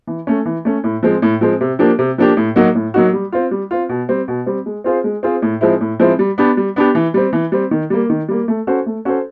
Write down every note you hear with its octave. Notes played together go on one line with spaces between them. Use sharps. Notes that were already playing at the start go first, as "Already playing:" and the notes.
E3
A3 C#4
E3
A3 C#4
A2
F3 G#3 C4
A2
F3 G#3 C4
C3
F3 A#3 D4 G4
C3
F3 A#3 D4 G4
A2
F#3 A#3 D#4 F#4
A2
F#3 A#3 D#4 F#4
G3
C4 F4
G3
C4 F4
B2
G3 C4
B2
G3 C4
G#3
C4 F4 G#4 C5
G#3
C4 F4 G#4 C5
A2
F3 G#3 C4 E4
A2
F3 G#3 C4 E4
G3
B3 D4 G4
G3
B3 D4 G4
E3
G3 C4
E3
G3 C4
D#3
G3 A#3
D#3
G3 A#3
A3
C#4 F#4 A4 C5
A3
C#4 F#4 A4 C5